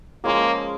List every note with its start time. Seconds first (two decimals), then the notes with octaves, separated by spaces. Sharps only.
0.24 F3 G#3 A#3 C#4 G#4